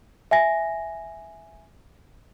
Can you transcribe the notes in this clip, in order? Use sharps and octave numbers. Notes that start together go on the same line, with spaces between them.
E5 G#5 A#6